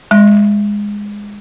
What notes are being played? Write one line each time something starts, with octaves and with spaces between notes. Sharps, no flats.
G#3